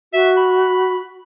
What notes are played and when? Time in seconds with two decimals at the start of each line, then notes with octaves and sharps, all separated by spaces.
0.13 F#4 E5
0.37 B5